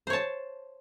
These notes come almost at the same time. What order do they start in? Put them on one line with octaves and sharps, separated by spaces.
C5 C#5 A5